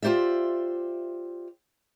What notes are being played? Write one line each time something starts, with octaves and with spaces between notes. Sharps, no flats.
F4 G4 C5 D5 E5